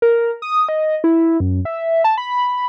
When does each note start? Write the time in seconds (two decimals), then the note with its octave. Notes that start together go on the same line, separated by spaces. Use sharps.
0.02 A#4
0.42 D#6
0.69 D#5
1.04 E4
1.40 F#2
1.65 E5
2.04 A5
2.18 B5